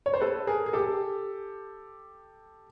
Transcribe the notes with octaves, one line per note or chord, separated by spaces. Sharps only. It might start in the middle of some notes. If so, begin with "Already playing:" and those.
C#5
C5
A4 B4
G#4 A#4
G#4
G4 A4